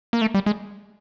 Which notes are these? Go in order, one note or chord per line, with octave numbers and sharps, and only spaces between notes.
A#3
A3
G3
G#3